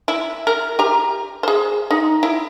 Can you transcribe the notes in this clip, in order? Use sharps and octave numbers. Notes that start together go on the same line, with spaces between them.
E4
A#4
G4 A#5
G#4 C5
D#4
E4